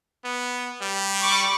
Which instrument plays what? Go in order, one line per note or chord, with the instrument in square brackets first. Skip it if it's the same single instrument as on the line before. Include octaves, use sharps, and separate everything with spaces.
[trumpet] B3
G3
[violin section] B5 C#6 D6